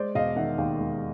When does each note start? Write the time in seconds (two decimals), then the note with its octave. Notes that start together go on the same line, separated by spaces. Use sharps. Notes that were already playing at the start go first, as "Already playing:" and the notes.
Already playing: G#3 C5 D5
0.15 E1 D#5 F5
0.36 D#3 E5 F#5
0.58 D#2 F5 G5
0.79 G#3